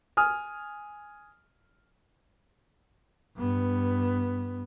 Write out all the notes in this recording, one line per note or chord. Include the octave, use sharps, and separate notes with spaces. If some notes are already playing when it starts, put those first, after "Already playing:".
G#5 D#6 F6
G2 B3